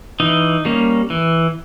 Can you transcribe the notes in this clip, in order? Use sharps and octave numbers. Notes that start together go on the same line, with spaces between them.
E3 D#4
G3 A#3 C#4
E3